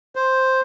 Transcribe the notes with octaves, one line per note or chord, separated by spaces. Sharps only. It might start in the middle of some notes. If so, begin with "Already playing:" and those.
C5